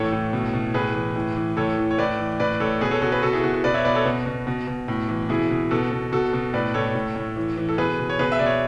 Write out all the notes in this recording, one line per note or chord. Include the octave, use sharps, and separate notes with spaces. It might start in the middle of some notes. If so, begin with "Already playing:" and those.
Already playing: A2 E3 A4 C#5
A2
B2
B2
A2 G#4 B4
E3
A2
E3
A2 A4 C#5
E3
C#5
A2 B4 D5
E3
A2 B4 D5
A2 A4 C#5
B2 G#4 B4
A4 C#5
B2 F#4 A4
G#4 B4
B2 F#4 A4
E4 G#4
B2 F#4
F#4
B2 B4 D5
C#5 E5
B2 B4 D5
A4 C#5
B2 F#4
B2
B2
B2
A2
E3
B2 E4 G#4
B2
B2 F#4 A4
B2
B2 F#4 A4
B2
A2 B4 D5
A2 A4 C#5
A2
A2
E3
E3
A4
B2 G#4 B4
B2
C#5
B2 G#4 B4
E5
B2 D5
C#5